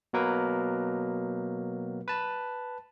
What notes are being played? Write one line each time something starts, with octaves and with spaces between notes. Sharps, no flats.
B2 F#3 A#3 A#4 B4
B4 A5